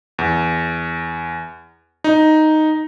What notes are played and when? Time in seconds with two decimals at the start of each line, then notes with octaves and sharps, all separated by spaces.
0.18 E2
2.04 D#4